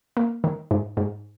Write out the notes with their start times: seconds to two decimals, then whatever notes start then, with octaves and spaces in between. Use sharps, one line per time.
0.17 A#3
0.44 D#3
0.71 G#2
0.97 G#2